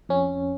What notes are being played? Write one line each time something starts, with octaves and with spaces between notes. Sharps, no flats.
F2 C#4